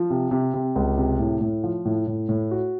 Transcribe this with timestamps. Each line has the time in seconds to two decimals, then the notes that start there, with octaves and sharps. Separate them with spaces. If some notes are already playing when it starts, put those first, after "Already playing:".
Already playing: F3
0.10 C3
0.31 C3
0.54 C3
0.76 C#2
0.98 C3
1.19 A2
1.41 A2
1.64 F3
1.85 A2
2.07 A2
2.29 A2
2.51 F#4